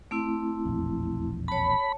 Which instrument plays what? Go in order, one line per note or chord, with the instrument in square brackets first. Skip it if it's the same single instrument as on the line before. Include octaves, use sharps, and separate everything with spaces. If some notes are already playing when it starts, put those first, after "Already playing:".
[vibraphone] A3 C4 E4
[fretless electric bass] E1 A#1 F2
[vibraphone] C#5 A5 [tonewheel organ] B5